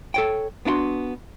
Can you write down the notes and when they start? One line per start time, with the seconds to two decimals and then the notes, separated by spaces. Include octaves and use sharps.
0.14 A4 C#5 G5
0.65 B3 D4 E4 F#4 C6